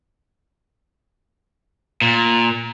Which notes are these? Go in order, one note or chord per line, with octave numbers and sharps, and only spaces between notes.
A#2